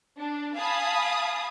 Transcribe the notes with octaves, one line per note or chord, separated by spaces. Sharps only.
D4
F5 G#5 A5 B5 D#6